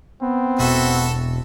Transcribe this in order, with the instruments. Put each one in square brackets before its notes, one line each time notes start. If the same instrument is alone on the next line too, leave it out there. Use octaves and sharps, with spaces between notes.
[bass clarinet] B3 [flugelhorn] C4
[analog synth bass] E1 [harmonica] F#4 A4 E5